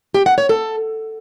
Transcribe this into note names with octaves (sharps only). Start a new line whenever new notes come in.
G4
F#5
C#5
A4